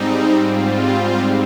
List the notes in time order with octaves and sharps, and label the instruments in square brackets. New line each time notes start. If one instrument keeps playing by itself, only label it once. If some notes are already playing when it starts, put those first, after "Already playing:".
Already playing: [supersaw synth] G#2 G3 C4 D#4
F4